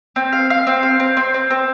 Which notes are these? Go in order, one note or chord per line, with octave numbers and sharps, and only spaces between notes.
C4
F5
F5
C4
F5
C4
C4
C4
C4